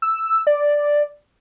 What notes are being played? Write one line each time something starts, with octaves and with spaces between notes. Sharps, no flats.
E6
D5